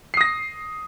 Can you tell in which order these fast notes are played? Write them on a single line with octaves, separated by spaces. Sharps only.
C7 D#6 A#6